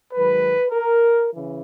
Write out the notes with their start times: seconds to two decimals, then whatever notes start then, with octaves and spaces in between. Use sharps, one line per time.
0.13 G#2 D#3 F#3 B4
0.72 A#4
1.31 C#3 E3